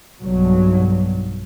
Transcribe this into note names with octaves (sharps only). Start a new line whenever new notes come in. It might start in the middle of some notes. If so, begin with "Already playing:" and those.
B1 G2 F#3